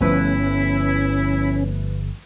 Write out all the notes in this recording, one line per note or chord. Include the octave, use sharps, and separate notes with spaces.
G1 F3 A3 B3 C#4 E4 B4